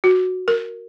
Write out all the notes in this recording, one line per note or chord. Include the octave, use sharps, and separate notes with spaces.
F#4
A#4